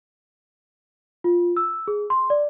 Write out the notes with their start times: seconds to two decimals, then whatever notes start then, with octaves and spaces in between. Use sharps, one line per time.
1.24 F4
1.57 E6
1.88 G#4
2.10 C6
2.30 D5